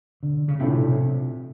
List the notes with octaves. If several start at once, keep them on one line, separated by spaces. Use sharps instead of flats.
D3
C#3
B1 A2 C3 F3 A3 D4